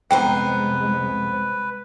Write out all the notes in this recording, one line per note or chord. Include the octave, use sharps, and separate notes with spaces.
C2 F2 G#3 B3 B4 C5 G5 A#5